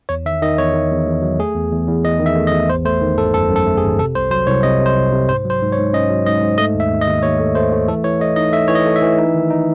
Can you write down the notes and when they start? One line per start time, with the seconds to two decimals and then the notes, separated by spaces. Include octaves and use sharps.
0.09 E2 C#5
0.26 D#3 E5
0.41 D#3 D#5
0.58 E2 C#5
0.74 D#3
0.91 E2
1.07 E2
1.22 F#3
1.39 A3 G#4
1.55 E2
1.72 E2
1.87 E2
2.04 E2 D#5
2.20 D#3
2.26 E5
2.36 A3
2.47 D#5
2.52 E2
2.69 G#1 C5
2.85 A3 C5
3.01 D#3
3.18 G#1 A4
3.34 F#2 A4
3.49 F#2
3.56 A4
3.66 A3
3.77 G#4
3.82 G#1
3.99 C3 A4
4.15 C2 C5
4.31 F#3 C5
4.47 C2 C#5
4.63 C3 D#5
4.80 C3
4.86 C5
4.97 C2
5.12 C3
5.29 G#2 C5
5.45 F#3
5.50 C5
5.61 G#2
5.72 C#5
5.78 G#2
5.93 C#4 D#5
6.10 F#3
6.26 G#2 D#5
6.42 G#2
6.58 A3 D#5
6.75 D#2
6.80 E5
6.91 D#2
7.01 D#5
7.06 D#2
7.23 D#2 C#5
7.39 A3
7.55 A3 C5
7.73 A3
7.88 E3 A4
8.04 E3 C#5
8.20 A3 D#5
8.36 D#4 D#5
8.53 A3 E5
8.68 E3 C#5
8.75 D#5
8.86 A3
8.96 E5
9.02 E3
9.18 D#4
9.34 D#3
9.50 D#4